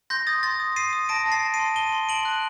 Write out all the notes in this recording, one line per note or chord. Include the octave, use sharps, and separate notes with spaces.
C6 G6 A#6
D#6 A6
C6 A6
D#6
D#6 C7 D#7
D#6
A5 A#6 D7
A5
A6 C7
A5
C7 D#7
C6
A5 D#7 G7
C6
A5 D7 F#7
F#6